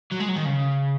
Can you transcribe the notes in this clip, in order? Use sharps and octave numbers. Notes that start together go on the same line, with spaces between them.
F#3
G#3
F#3
D#3
C#3